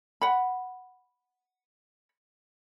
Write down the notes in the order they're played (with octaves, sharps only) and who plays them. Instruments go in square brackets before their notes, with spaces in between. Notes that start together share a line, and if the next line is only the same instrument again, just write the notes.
[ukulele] F#5 B5